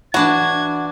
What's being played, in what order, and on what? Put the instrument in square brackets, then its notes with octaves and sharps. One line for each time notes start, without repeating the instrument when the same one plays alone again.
[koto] E3 D4 A5 [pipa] F#4 [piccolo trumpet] G#6